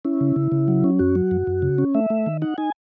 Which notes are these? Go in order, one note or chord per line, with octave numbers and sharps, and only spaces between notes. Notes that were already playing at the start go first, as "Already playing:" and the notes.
C#4 E4
C#3
C#3
C#3
F#3
C#4
F#2 F#4
F#3
F#2
F#2
C#3
C#4
A3 E5
A3
D#3
D#4 F#5
D#4 G#5